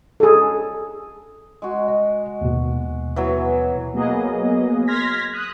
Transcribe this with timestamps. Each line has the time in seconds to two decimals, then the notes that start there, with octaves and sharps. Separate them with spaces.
0.20 G#4 A4
1.62 G#3 F#4
1.88 D#5
2.41 D#2 B2
3.16 E3 F#3 B3
3.93 F#3 A#3 B3 G#4 D#5
4.87 C6 F6 G#6 A#6 B6
5.33 D#6 F#6